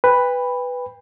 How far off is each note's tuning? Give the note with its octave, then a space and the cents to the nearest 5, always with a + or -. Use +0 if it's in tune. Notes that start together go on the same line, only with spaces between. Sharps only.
B4 +5 G5 +40 B5 +0